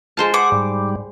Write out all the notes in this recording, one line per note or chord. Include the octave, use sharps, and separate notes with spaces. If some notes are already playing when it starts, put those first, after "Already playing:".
G#3 F4 C5 A5
G#4 F#5 D6
G#2 G3